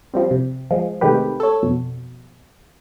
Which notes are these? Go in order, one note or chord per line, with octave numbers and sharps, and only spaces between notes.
F3 G3 C4
C3
F3 G#3
C3 D#3 G#3 A3 G4 B4
A4 C#5
F2 B2